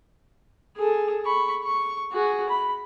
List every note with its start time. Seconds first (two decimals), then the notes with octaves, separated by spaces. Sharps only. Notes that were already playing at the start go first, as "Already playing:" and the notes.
0.77 G#4 A4
1.25 B5 C#6
1.64 C#6
2.12 F#4 G#4
2.49 B5